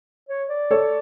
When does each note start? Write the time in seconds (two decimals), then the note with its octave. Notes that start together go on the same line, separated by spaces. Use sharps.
0.29 C#5
0.49 D5
0.71 A4 C#5